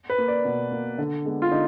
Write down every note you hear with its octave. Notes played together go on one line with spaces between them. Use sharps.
B4
A#3
D5
B2
A#3
D3
G#3 B3
F4
D3 D#4